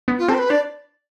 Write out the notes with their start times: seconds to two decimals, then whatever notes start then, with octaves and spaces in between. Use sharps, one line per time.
0.08 B3
0.19 F4
0.28 C4 A4
0.34 C5
0.39 B4
0.50 D4 D5